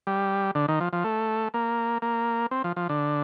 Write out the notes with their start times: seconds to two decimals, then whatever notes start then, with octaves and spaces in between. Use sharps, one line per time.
0.07 G3
0.55 D3
0.68 D#3
0.81 F3
0.93 F3
1.04 A3
1.54 A#3
2.02 A#3
2.51 C4
2.64 F3
2.76 F3
2.89 D3